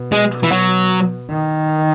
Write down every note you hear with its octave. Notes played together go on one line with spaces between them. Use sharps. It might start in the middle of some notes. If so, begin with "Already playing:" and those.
Already playing: B2
G#3
E3
F#3
D#3